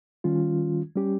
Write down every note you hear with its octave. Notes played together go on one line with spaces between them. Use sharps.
D#3 G3 C#4 F4
G3 C#4 G4